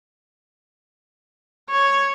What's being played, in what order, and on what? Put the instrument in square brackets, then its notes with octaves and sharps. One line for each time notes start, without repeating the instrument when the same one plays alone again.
[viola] C#5